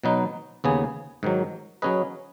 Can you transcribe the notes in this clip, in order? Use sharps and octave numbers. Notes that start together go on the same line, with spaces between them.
B2 F#3 D#4 B4
D#2 C#3 B3 G#4
G#2 D#3 F#3
F#3 C#4 G#4 B4 D#5